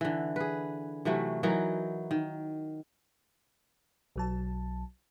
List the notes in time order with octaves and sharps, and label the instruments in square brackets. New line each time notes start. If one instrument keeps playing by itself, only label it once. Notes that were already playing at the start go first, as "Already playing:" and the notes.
[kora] D3 E3
G#4 B4
C3 E3 F#3 A3
E3 F#3 D#4 A#4
D#3
[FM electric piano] B1 F#3 A5